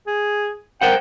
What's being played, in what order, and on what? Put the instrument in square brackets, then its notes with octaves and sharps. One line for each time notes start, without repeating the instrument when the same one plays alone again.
[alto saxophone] G#4
[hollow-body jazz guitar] A#4 C5 F#5 [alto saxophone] G5